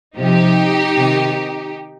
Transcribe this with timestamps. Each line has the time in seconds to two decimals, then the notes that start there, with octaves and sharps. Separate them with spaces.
0.17 C3 F3 D#4 G4
0.96 C3 D#3